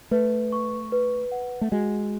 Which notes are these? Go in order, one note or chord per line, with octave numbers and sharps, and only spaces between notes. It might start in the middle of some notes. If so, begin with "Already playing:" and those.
A3 B4
C#6
B4
F#5
A3
G#3 F#4